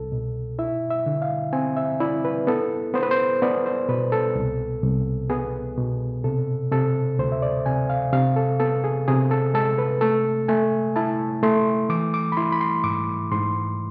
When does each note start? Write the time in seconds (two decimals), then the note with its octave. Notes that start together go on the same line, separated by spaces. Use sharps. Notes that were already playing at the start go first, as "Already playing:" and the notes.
Already playing: C2 A4
0.12 B2
0.59 E4 E5
0.90 E5
1.06 D3
1.22 F5
1.53 C4 G#5
1.76 E5
2.00 E4 D5
2.25 B4
2.47 B3 A4
2.94 B3 C5
3.03 B4
3.11 C5
3.42 B3 D5
3.66 C5
3.89 B2 B4
4.12 A4
4.35 C2
4.83 C2
5.30 B3 G#4
5.78 B2
6.24 C3 A4
6.72 C3 A4
7.19 D2 C5
7.32 E5
7.42 D5
7.66 C3 G#5
7.90 F5
8.13 C3 F5
8.36 A4
8.60 B3 A4
8.84 G#4
9.08 C3 G#4
9.31 A4
9.54 G#3 A4
9.78 B4
10.01 A3 A4
10.48 A3 G#5
10.96 E4 A5
11.43 A3 C6
11.89 E3 D6
12.14 D6
12.32 B5
12.37 E4 C6
12.52 B5
12.61 C6
12.84 G#2 D6
13.31 G#2 C6